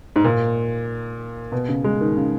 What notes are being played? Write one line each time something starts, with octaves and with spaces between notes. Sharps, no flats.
G#2
A#2
B2
C#3
G#3
D#3
C#3